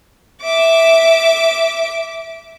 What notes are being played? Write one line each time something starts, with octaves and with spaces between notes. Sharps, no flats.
E5 D6